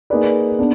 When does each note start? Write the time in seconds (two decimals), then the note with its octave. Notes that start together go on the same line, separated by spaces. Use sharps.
0.10 A#3 D#4 G#4 B4 D5
0.59 B3 D4